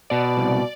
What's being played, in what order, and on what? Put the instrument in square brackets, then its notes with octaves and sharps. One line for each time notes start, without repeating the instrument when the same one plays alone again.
[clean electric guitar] B2 [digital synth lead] D5
[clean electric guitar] C2